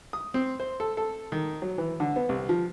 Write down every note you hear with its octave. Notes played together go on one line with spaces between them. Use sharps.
D#6
C4
C5
A4
A4
D#3
F#3
E3
D3
B3
C2
F3